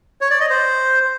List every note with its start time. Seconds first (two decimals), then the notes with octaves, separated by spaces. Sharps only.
0.21 C#5
0.31 D5
0.40 D#5
0.50 C5